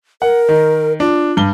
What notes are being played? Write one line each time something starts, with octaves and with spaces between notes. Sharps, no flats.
A#4 F#5
D#3
D4 F4
G2 G7